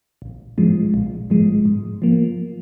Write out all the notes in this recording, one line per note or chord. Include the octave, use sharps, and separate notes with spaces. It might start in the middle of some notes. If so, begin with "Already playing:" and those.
A#1
G#2 F3 G#3
A#1
G#2 F3 G#3
G#2
F3 A#3